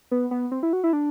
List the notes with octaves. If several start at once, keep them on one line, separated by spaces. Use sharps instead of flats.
B3
B3
C4
E4
F#4
E4
D4